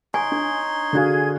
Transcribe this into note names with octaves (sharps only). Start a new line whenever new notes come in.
D#4 C#5 G#5 C6
D4
D3 F#4 G#4 F5 G#6